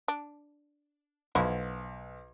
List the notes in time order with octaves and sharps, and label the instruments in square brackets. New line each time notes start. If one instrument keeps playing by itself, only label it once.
[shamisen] D4
[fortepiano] B1 [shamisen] F3 E4 F#4